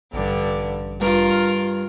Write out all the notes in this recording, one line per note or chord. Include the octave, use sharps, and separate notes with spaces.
A1 G2 D3
G2 F4 A#4